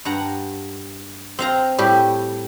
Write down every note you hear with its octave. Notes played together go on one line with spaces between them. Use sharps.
G2 F#5 A#5
C4 F5 A#5
A2 G3 G4